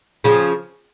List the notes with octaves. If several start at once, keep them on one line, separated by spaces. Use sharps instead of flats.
C#3 F3